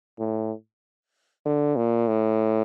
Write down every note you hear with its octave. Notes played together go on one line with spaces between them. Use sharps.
A2
D3
A#2
A2